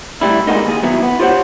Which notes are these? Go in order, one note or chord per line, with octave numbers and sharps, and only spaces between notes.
A2 G3 E4
A#2 D3 G#3 A#3 B3 D#4
D#2 G#4
D#3 F#3 B3 E4
B3
F4 G4 C5 C#5 F#5